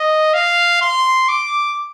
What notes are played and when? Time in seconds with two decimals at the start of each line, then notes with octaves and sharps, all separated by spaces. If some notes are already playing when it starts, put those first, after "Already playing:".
Already playing: D#5
0.34 F5
0.82 C6
1.29 D6